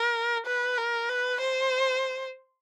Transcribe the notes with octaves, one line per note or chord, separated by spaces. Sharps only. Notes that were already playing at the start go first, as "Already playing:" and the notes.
Already playing: A#4
B4
A#4
B4
C5